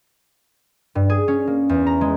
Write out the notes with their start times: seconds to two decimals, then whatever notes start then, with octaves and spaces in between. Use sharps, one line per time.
0.95 G2
1.10 G#4
1.28 C#4
1.47 A#3
1.69 E2
1.87 A#5
2.01 G#3